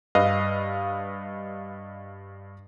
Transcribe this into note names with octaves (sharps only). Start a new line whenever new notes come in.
G2 B4 D#5 F5